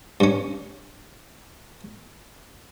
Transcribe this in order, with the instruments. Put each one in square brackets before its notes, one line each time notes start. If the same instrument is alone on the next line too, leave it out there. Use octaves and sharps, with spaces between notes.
[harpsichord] G2 C#4